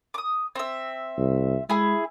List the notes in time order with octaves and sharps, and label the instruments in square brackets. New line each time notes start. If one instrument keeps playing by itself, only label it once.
[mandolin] D6 D#6
C4 E5
[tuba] C2
[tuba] G#3 [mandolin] E4 G#4